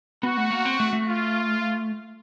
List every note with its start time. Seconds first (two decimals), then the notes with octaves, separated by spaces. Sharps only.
0.23 B3 F#4
0.37 A3
0.51 A#3
0.65 C4
0.80 A3
0.93 A3
1.07 F4